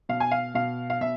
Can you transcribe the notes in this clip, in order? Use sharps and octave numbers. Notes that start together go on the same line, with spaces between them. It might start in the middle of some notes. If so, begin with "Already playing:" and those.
B2 F5
G#5
F5
B2 F5
F5
B2 E5